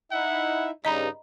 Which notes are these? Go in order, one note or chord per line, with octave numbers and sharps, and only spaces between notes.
D#4 E4 E5 F#5
G2 C#3 G3 D#4 D#5 A#5 B5